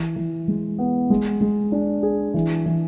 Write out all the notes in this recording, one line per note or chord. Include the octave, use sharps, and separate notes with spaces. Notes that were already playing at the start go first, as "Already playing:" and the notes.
Already playing: E3
E3
G#3
B3
G#3
G#3
D4
G#4
E3
E3